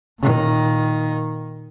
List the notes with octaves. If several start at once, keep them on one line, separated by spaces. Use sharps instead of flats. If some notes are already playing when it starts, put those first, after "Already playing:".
A#2 D#3